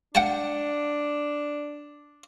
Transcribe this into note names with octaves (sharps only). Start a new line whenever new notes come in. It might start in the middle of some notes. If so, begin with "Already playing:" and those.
D4 F#5 G5 A5